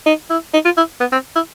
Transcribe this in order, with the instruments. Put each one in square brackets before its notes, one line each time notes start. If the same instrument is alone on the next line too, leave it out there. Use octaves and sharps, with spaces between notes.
[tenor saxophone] D#4
E4
D#4
F4
E4
B3
C4
E4